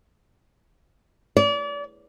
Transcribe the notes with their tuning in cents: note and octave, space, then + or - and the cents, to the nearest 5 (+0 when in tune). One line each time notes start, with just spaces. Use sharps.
D5 -35